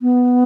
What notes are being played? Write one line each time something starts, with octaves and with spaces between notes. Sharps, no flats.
B3